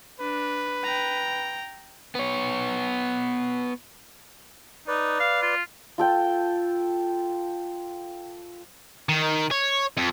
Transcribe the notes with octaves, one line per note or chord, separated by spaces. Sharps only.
D4 B4
G5 A#5
B3 C#5
D#4 B4 D5
F5
F4
F4 A4 G5 A5
D#3
C#5
F2